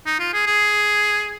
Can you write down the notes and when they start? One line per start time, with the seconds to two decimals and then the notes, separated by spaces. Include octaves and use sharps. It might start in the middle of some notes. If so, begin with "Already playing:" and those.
0.06 D#4
0.19 F4
0.33 G#4
0.47 G#4